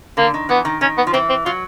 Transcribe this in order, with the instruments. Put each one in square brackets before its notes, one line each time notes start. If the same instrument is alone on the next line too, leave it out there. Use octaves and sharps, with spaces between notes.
[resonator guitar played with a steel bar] D3 [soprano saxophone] A#3
[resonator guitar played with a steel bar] D#3
[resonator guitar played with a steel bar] E3 [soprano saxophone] B3
[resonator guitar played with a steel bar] D#3
[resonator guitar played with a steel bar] D#3 [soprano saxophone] C#4
[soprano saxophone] B3
[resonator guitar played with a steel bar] F3
[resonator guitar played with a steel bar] E3 [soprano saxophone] C4
[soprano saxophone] C4
[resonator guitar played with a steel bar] F#3 [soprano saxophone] F4